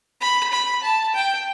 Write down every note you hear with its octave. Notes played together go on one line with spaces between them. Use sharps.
B5
B5
A5
G5